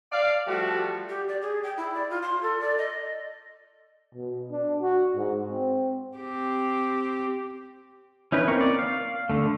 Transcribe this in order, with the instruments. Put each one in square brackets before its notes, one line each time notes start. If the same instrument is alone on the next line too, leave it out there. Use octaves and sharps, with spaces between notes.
[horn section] D5 F5
F3 G3 A3 F#4
[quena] G4
D5
G#4
G5
E4
D5
F4
C6
A4
D5
D#5
[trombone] B2
D4
F#4
G#2
C4
[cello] C4 G4
[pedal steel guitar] C#4 D#4 E4 B4
A#3 C4 A#4 A#5 C#6
D5
F5
D3 A3